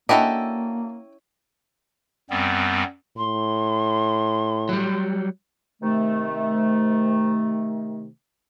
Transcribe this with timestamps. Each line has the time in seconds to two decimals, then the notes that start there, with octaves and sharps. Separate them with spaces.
0.09 A#3 C#4 D4 E4 F#4 A4 D#5 G5
2.30 F#2 G3 B3 C4
3.17 A2 C6
4.69 F#3 G3
5.83 C3 D#3 A3